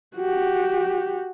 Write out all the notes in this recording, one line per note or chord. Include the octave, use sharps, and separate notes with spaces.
F#4 G4